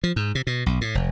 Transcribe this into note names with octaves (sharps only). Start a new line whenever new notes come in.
F3
G#2
C3
B2
B1
A2
F1